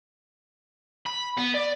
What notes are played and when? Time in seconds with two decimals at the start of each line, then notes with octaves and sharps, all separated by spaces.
1.06 B5
1.37 B3
1.54 D5